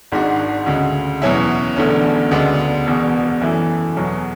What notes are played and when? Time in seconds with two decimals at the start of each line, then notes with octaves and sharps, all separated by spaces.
0.12 G#1 G#2 G#3 D4 F#4
0.66 D2 C#3 G#3
1.22 E2 B2 F#3 C#4 E4
1.76 E1 E2 D3 A3 C#4
2.31 D2 C#3 G#3 B3 D4
2.86 E1 E2 B2
3.41 F#2 E3 A3 E4
3.96 E2 B2 F#3